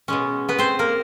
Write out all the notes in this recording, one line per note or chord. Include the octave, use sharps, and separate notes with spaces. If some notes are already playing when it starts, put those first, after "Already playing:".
B2 G#3 C#4
B3 B4
C4 C5
A#3 A#4